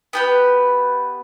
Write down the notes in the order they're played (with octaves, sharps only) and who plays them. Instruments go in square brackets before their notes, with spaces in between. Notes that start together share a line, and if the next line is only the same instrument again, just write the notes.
[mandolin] B3 G4 B4